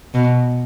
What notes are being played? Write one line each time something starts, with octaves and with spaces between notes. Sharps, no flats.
B2